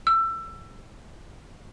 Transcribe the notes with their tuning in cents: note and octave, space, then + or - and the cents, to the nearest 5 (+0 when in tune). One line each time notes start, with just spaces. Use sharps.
E6 +20